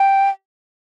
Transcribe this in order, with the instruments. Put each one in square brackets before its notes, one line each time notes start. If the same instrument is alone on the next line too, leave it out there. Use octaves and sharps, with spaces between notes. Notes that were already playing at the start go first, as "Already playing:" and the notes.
Already playing: [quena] G5